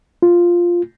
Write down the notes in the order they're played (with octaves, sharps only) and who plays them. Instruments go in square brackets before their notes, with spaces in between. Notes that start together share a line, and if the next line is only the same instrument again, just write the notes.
[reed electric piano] F4